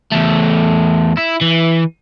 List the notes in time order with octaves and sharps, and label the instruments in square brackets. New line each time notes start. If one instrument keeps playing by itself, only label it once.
[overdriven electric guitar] E2 A3
E4
E3